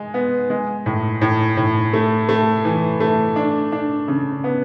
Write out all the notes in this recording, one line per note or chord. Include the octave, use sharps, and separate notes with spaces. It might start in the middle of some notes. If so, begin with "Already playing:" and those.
Already playing: G#3
B3
G#3
A2
A2
A2
A3
A3
E3
A3
D4
D4
C#3
B3